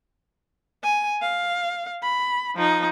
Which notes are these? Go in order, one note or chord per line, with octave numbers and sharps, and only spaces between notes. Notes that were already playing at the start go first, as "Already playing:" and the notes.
G#5
F5
B5
F3 D#4